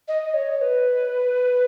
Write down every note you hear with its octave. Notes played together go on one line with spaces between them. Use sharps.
D#5
C#5
B4